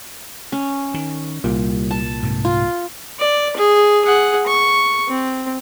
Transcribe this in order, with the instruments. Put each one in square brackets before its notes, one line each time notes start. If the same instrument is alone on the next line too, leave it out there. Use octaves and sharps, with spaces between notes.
[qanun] C#4
[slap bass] D#3
[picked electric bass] C2 A#2 [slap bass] G3
[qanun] A5
[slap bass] G#2 C3
[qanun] F4
[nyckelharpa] D5
G#4
G#4 F#5
C#6
C4